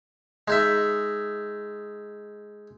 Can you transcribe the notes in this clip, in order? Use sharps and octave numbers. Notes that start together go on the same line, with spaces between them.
G#3 D#4 E5